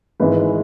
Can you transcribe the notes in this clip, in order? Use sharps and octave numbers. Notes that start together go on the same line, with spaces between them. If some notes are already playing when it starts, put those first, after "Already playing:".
G#1 G#2 E3 G#3 B4